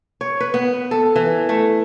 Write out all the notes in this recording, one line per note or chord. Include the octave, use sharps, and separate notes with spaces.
C#5
B4
B3
A4
E3
A3